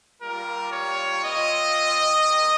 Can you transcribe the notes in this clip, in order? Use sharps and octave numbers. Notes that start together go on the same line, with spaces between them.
G3 A#3 F4 A#4
C#5
C4 F4 D#5
A#3